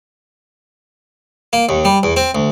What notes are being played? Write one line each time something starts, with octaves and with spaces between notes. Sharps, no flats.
A#3
D#2
G3
E2
C4
D2